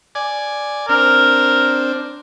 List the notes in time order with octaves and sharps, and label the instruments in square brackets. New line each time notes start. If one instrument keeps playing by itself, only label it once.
[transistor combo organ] D5 G#5
[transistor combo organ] C4 D4 [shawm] A#4